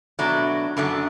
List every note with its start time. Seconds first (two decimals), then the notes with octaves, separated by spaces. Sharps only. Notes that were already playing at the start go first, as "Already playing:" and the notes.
0.19 B2 F#3 A3 D4
0.77 F#2 D3 A3 D4